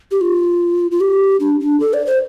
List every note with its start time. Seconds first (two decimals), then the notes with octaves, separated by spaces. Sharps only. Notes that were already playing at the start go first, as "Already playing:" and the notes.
0.11 G4
0.21 F4
0.91 F4
1.01 G4
1.40 D4
1.61 D4
1.80 A4
1.94 D5
2.06 C5